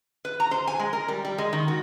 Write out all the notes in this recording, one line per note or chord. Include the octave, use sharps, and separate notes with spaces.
B4
A#5
C5
G#5
G#3
A#4
G3
G3
G#3
D#3
F#4